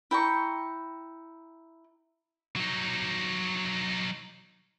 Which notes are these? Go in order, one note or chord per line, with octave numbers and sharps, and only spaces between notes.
E4 G5 A#5 C#6
F#3 D#4